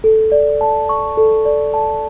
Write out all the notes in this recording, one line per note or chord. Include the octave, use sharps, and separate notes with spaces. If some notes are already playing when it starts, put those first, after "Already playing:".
A4
D5
A5
C#6
A4
D5
A5